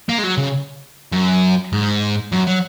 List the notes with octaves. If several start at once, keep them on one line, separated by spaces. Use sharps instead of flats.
A#3
G#3
F#3
C#3
F#2
G#2
F#2
F#3